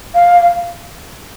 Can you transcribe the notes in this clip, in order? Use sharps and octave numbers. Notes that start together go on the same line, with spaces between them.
F5